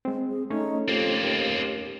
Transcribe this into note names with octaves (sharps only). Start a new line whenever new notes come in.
G#3 C4
G#4
A3 C#4 D#4 C#5
F2 A#3 C4 G4
D#2